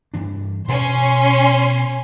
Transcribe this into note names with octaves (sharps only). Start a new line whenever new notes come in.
G2 E3 D4
B2 C#4 G#5 C6